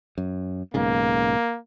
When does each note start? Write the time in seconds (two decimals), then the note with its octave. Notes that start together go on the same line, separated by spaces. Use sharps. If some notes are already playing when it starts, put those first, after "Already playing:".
0.18 F#2
0.74 B1 G#2 C#3 A#3